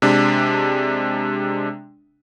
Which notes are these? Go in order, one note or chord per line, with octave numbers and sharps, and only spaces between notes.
C3 G#3 D4